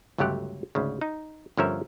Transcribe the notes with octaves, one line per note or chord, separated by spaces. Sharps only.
G1 C#2 F#3 A3 G4 F#5
D2 G#2 C#3
D#4
G1 D3 F3 C#4 A#4 E5